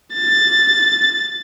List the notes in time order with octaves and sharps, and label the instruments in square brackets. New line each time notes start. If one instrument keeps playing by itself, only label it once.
[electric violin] A6